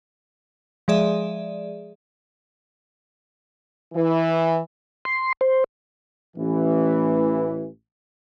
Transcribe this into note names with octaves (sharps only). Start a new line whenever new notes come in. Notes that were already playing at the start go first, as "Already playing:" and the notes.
F3 G#3 G#4 D5 E5
E3
C6
C5
A1 E3